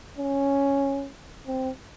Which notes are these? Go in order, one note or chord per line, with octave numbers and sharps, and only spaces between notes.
C#4
C4